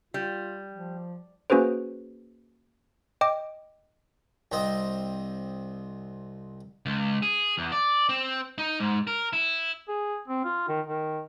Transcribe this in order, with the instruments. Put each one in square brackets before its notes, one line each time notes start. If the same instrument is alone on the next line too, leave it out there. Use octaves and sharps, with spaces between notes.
[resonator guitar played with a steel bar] G3 [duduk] F4
[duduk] F3
[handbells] A#3 C#4 F#4 G#4 B4 C5
D#5 G5 D6
[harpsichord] C2 C4 D#5
[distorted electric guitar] C#2
G#4
E2
D5
C4
D#4
G#2
A#4
E4
[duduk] G#4
C4
F4
D#3
D#3